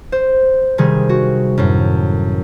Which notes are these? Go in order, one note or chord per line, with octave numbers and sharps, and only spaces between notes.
C5
C3 D#3 G3 G#4
F#4
F#2 A2